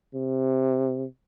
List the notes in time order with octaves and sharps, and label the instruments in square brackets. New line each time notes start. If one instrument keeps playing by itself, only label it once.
[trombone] C3